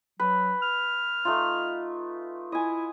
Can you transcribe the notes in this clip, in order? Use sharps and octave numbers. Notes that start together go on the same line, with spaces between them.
F#3 B4
F6
A3 D#4 F4
E4 D#5 G#5